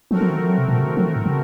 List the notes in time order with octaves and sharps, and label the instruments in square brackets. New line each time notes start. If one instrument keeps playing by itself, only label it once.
[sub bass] F3 [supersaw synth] A3 C4 F#4 A#4
[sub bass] F3
D#3
F3
F#3
C3
A#2
C#3
D#3
F3
D#3
A2
C#3